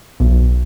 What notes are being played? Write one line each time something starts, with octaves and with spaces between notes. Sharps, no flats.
B1